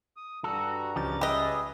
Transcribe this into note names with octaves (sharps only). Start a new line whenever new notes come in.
D#6
G2 G3 F#4 A4 A#5
C#2 F3 C#4 G4 A6
G4 G#4 B4 D#5 E5